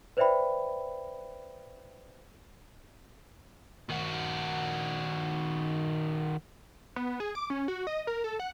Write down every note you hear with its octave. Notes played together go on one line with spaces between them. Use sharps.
B4 C5 D5 E5 G5 B5
D#3 F#4
B3
G#4
D6
C#4
F#4
D#5
A#4
A4
F#5